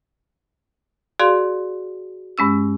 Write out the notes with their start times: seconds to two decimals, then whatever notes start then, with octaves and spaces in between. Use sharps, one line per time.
1.19 F#4 G#4 D5 F5 C6
2.38 G2 G#3 C#4 E6